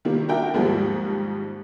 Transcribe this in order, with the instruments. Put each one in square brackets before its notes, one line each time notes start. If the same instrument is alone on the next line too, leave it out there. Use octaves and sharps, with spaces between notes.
[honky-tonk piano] C3 D#3 G3 A#3
D4 F#4 A#4 E5 G5
D#2 G#2 F3 G3